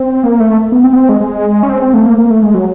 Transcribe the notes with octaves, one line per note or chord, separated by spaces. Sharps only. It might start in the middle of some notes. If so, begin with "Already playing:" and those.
Already playing: C4
A#3
A3
B3
C4
B3
C4
G#3
G#3
C#4
C4
C4
A3
A#3
A#3
A3
G#3
F#3